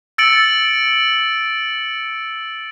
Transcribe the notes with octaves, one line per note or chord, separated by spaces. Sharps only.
E6 A6 C#7 D7 F#7